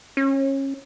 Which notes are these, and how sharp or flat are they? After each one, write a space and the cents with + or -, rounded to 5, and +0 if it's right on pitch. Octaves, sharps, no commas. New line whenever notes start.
C#4 -25